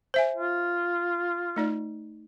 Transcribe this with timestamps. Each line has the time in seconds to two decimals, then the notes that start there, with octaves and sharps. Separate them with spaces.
0.14 C5 E5 G#5
0.36 F4
1.56 A3 D#4 D5